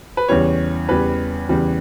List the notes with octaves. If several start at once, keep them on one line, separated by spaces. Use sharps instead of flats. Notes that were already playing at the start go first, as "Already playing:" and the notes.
B4
E2 C#3 E3 G3 C#5
E2 C#3 E3 G3 B4
E2 C#3 E3 G3